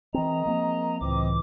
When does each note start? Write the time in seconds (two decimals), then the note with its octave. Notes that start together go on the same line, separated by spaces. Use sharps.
0.14 E3 G#3 C4 A#4 D#5 A#5
0.45 F3 A#3 C4
1.01 C#2 A2 E3 C4 D#5 D6